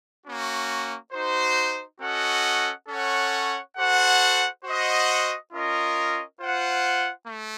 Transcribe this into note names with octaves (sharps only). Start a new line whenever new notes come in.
A#3 C#4 F#4
D#4 F#4 C5
C#4 F#4 A4 D#5 F#5
C#4 A4 C#5 F#5
F#4 A4 C5 F#5
F#4 C5 D#5 F#5
C#4 F4 A#4 D#5
F4 C5 F#5
A3